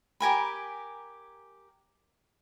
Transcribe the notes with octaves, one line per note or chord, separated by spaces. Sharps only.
G4 A#4 G#5 B5